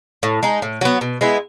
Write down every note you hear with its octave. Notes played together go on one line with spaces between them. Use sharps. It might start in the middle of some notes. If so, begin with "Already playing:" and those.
A2
G#3 D#4
A2
F#3 B3
B2
G#3 B3 E4